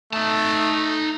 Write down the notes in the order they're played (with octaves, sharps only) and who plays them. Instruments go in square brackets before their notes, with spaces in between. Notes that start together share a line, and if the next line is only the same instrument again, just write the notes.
[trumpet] A3 [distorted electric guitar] D#4 A5